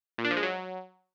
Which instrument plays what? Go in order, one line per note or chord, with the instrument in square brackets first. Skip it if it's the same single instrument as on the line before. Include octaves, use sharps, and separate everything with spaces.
[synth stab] A#2
D4
F3
G#3
F#3